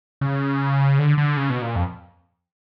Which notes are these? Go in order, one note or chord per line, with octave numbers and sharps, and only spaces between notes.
C#3
D3
D3
C#3
B2
A#2
F2